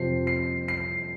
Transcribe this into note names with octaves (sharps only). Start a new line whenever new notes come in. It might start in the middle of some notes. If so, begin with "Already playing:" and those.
Already playing: F2 C3 F3 C4 C7
C7
C7